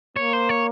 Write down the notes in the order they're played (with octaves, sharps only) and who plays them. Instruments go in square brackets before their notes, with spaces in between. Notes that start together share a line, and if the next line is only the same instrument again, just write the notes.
[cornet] A#3 [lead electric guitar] C#5
[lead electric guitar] C5
C#5